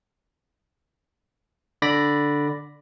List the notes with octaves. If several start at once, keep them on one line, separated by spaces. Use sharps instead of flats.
D3 D5 B5 A#6